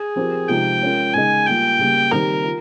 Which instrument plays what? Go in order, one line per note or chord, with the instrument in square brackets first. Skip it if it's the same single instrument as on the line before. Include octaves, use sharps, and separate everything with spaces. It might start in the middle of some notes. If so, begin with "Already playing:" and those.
Already playing: [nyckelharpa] G#4
[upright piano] F3 C4 G4 A#4
[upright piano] C3 F3 G#3 D#4 G4 [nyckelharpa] G5
[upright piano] G#3 C#4 F4 A#4
[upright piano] C#3 G#3 D#4 G#4 D#5 [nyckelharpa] G#5
[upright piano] G3 A#3 F4 [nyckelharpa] G5
[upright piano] C#3 G3 A#3
[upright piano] D#3 G3 C4 G4 [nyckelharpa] A#4
[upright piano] F4